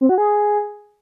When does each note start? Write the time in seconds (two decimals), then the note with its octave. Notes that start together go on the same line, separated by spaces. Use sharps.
0.01 C4
0.09 F#4
0.18 G#4